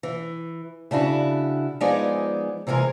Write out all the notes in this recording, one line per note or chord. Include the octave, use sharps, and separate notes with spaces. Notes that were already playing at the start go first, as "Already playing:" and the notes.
E3
C#3 D4 E4 F#4
F3 G#3 B3 D#4 G#4 D5
C3 E3 G#3 G#4 A#4